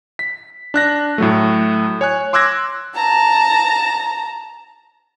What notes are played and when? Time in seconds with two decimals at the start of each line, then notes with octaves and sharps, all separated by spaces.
0.19 B6
0.74 D4 F#6 A#6
1.18 A2 F#3 A3
2.01 C#5 G#5 F#6
2.33 C6 D6 E6 F#6 G#6 A#6
2.95 A5 A#5